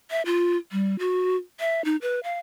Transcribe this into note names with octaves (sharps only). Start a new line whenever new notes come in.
E5
F4
G3
F#4
E5
D#4
B4
F5